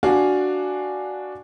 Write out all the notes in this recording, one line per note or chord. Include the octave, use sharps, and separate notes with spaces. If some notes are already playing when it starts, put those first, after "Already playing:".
D4 F#4 F5 G#5